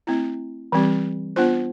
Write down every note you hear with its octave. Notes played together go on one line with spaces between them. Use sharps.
A3 C4 E4
E3 G3 C4 G4
B3 D4 F4 C5